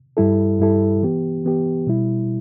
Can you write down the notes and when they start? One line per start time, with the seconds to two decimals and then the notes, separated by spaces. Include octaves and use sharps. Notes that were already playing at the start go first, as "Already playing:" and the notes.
0.17 G2 G3 E4 A4
0.59 G2 G3 E4 A4
1.03 E3 B3 G4
1.45 E3 B3 G4
1.87 B2 G3 E4